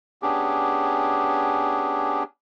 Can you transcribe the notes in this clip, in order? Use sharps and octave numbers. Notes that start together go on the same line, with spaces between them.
B3 C#4 D4 G4 G#4